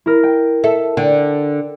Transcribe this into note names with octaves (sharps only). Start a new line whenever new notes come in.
E4 A#4
G5
A4 E5
D3 G5